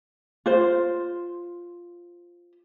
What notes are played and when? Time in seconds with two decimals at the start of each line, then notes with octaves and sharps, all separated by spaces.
0.46 F4 C5